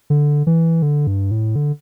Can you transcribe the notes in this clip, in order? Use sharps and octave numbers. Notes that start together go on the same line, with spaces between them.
D3
E3
D3
G2
A2
D3